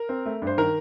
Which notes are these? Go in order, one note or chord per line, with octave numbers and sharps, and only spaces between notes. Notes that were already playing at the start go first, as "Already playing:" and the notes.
Already playing: A#4
C4
A3
G2
C5
D#3 A#4